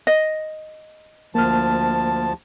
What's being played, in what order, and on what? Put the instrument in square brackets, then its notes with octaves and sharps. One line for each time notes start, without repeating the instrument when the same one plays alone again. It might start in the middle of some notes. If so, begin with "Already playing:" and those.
[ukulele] D#5
[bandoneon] D2 F3 A5 [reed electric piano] A#3 F6